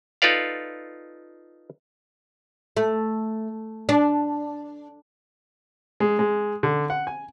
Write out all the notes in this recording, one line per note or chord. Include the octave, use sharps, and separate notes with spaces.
D#4 F4 A4 B4 D5 F5
A3
D4
G#3
G#3
D3
F#5
G#5